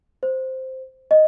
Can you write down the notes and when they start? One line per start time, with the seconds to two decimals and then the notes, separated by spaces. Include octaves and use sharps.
0.23 C5
1.11 D#5